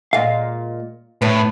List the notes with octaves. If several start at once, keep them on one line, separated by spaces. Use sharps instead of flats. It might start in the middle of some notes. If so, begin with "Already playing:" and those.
A#2 G#3 F5
A2 B3 D4 B4